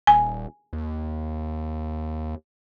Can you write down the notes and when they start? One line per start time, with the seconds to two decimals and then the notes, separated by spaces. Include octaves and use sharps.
0.07 D#1 G#5
0.73 D#2